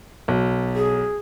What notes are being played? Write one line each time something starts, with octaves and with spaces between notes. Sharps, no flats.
B1
G#4